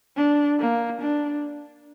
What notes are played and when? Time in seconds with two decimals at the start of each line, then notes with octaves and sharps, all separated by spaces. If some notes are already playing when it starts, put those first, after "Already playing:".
0.17 D4
0.59 A#3
1.02 D4